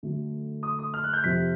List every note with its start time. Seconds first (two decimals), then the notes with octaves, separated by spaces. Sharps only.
0.03 D3 F#3 A3
0.63 D#6
0.79 D#6
0.94 F6
1.04 F#6
1.13 G6
1.24 F2 C3 F3 B6